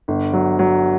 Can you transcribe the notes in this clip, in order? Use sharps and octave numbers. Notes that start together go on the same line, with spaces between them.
G1
F#3
F#3